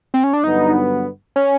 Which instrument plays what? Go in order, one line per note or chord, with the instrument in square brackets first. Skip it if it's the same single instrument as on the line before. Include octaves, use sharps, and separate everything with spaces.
[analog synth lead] C4
C#4
D4
[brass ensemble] G2 D3 F#3 B3 [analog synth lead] D#4
[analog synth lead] C#4